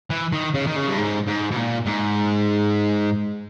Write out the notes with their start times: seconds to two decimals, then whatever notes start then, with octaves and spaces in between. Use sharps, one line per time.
0.10 E3
0.33 D#3
0.54 C#3
0.67 D#3
0.76 C#3
0.88 G2
0.98 G#2
1.27 G#2
1.51 B2
1.57 A#2
1.86 G#2